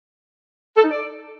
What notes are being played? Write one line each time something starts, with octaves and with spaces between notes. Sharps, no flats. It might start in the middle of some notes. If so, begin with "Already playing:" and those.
A4
D#4
D5